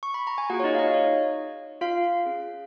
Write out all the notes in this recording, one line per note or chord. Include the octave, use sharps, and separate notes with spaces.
C#6
B5
A#5
G#5
A#3 F4 F#4 G#4 F#5
C#5
D#4 D#5
F5
D#4 D#5
C#5
F4 F5
C#4 G#4